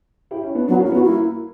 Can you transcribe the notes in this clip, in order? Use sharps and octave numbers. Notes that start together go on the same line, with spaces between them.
E4 G4
C#4 E4
B3 D4
F#3 B3 D4
A#3 C#4
E4
G3 B3
F#4
A#3 E4